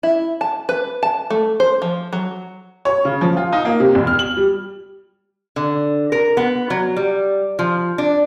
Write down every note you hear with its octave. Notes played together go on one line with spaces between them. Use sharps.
E4
A5
B4
A5
A3
C5
F3
F#3
C#5
C#3
F3
F4
D#4
A#3
C3
E1
F6
F#7
G3
D3
A#4
B3
F#3
G3
F3
D4